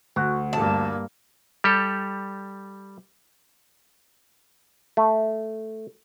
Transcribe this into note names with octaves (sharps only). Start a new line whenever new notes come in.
D2 F#4
G2 A#3 A5
G3 G4 A4
A3